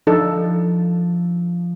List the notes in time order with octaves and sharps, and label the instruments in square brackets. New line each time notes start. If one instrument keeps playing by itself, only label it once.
[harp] F3 [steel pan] D4 D#4 A4